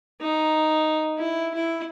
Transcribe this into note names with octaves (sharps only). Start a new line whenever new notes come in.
D#4
E4
E4